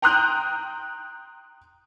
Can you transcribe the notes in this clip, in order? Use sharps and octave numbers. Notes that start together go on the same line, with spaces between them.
G5 A#5 C6 D#6 F#6 G6